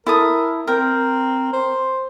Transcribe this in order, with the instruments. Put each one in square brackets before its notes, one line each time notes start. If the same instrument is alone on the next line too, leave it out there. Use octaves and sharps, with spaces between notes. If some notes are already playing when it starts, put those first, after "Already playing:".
[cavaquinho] E4 A4 D#6 [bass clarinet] A#4
[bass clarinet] C4 [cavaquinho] A#4 G5
[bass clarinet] C5